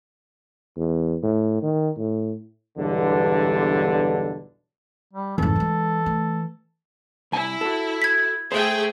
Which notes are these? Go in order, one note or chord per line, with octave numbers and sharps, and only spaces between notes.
E2
A2
D#3
A2
B1 E2 G2 D3
G3
F2 G#2 E3 A4
G3 G#3
A3
C2 E4 G#5
F#4 A4
G#6 B6
A3 G#4 C5 E5 G5